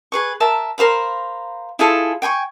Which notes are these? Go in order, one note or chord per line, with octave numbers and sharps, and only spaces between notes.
G#4 B4 C#6
A#4 E5 A5
A#4 C5 F5 B5
E4 F4 G#4 A4
G5 G#5 B5 C#6